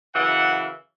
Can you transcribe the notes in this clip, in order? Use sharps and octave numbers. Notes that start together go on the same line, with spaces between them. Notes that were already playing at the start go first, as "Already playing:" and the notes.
F#2 C#3 E3 F#5